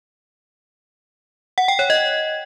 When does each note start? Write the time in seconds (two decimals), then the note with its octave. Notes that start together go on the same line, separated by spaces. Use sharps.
1.58 F#5
1.68 G5
1.79 C#5
1.90 D#5